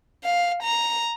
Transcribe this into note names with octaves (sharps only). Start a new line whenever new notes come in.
F5
A#5